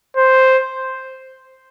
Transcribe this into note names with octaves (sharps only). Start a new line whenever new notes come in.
C5